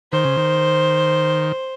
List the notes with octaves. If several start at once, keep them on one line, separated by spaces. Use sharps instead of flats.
D#3 C5
C#3
D#3